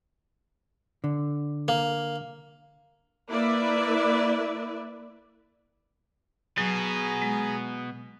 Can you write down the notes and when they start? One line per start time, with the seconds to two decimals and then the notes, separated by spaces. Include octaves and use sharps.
1.04 D3
1.68 A#3
3.28 A#3 E4 B4 D5 E5
6.58 B2 F#3 B3 G#4 G#5 A#5
7.22 G#3